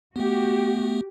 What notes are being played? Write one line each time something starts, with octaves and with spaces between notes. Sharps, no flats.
A3 B3 F#4 G4